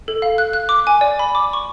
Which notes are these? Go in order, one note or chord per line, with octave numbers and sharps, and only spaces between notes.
A4
F5
F#6
F#6
D6
G#5
D5
B5
D6
C#6